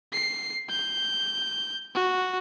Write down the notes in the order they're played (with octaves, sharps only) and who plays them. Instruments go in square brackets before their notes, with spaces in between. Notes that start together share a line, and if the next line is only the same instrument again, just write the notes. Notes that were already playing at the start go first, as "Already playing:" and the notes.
[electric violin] C7
G6
F#4